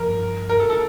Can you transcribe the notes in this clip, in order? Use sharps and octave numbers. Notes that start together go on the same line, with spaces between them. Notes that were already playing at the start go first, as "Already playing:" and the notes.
Already playing: G2 F3 A#3 A#4
A#4
A4
A4